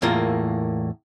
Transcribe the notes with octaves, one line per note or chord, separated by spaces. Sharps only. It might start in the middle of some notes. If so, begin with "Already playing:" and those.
E2 A2 A#3 F4 A#4